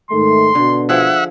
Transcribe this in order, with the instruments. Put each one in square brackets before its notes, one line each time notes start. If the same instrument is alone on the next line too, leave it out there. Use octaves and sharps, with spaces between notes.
[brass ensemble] G#2 D#3 A3 [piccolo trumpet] C6
[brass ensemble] B2 [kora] D3
[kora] F3 G#4 [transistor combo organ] E5 F#5